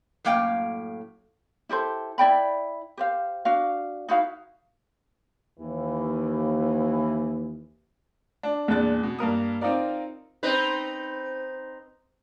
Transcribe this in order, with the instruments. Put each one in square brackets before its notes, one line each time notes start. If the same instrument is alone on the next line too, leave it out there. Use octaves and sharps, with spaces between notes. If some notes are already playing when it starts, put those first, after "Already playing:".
[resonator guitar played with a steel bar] F#2 A2 A#3 F5 G5
[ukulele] E4 G4 A4 C5
E4 D5 G5 B5
G4 C5 F5
D4 F#4 F5
D#4 E4 F#4 F5
[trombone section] D#2 E3
[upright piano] D4
E2 A#2 G#3 D4 F#6 A6
B2
G2 A#3 A#4 D#6
C4 D#4 F4 A#4 D5
[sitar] C4 D#4 B4